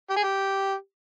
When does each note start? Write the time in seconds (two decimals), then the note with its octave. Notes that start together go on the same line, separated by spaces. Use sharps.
0.10 G4
0.17 G#4
0.23 G4